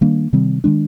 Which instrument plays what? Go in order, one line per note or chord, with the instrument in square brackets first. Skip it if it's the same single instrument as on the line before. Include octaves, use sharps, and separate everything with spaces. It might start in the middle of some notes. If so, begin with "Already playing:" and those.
[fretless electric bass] D#3 G3 A#3 D4
C3 D#3 G3 C4
D#3 G#3 D4